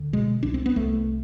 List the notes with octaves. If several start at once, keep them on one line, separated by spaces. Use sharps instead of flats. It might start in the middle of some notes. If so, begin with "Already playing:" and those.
Already playing: D2 D3
B2 G#3
C2 D4
C4
B3
C2 A3